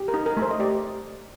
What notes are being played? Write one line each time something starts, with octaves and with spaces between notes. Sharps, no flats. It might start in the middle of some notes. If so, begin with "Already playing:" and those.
Already playing: G4
A#4
D#4
A#4
A3
C5
D#5
G4 D5